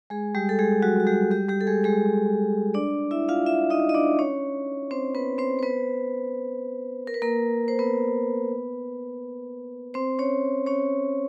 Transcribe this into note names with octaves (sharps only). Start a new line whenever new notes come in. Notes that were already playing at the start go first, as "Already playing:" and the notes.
G#3 G#4
G3 G4
A4
G#3 G#4
F#3 F#4
F#4
G3 G4
G3 G4
G3 G4
A4
G#3 G#4
G#3 G#4
D4 D5
E4 E5
F4 F5
E4 E5
D#4 D#5
D#5
D4 D5
C#4 C#5
C4 C5
B3 B4
C4 C5
C5
B3 B4
A#4
B4
A#3 A#4
C5
B3 B4
C4 C5
C#4 C#5
C#4 C#5